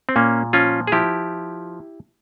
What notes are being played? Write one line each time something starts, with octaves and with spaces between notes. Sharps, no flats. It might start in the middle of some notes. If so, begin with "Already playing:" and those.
C4
A#2 A#3 C#4
F3 C#4 F4
G#4
F3 E4 G4